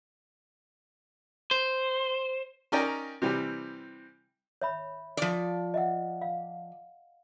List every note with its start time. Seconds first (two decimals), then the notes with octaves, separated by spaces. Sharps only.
1.51 C5
2.72 C#4 D#4 A#4 D5 G5 A#5
3.22 C3 E3 G3
4.62 C#5 E5 B5
5.17 F3 D5
5.74 D#5 E5 F#5
6.22 F5